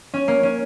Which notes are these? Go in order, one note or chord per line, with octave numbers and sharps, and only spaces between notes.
C#4
A#3
C#4